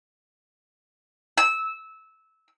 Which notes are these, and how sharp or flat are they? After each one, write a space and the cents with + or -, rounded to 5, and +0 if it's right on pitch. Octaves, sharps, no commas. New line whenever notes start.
E6 -15